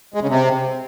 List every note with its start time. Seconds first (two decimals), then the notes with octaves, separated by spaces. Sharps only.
0.14 G#3
0.21 C#3
0.28 C3